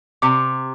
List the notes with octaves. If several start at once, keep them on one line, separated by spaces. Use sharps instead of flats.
C3 D6